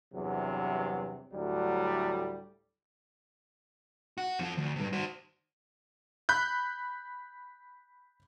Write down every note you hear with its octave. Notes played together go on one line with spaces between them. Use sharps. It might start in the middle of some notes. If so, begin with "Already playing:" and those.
E2 G2 C3 F#3
D2 A2 F#3 G3
F#4
F2 F3
D2
D2 G2
F#4 C5
B5 F#6 G6